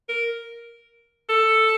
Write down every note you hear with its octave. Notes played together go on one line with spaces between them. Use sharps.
A#4
A4